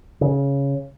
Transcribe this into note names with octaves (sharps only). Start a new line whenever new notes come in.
C#3